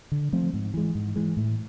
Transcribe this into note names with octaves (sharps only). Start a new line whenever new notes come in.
D3
F3 A3 C4
G#2
E3 G#3
G#2
E3 G#3
A2